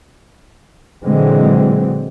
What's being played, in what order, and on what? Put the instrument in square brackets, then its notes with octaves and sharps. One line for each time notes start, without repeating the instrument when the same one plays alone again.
[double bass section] A#2 D3 E3 F#3 G#3 C4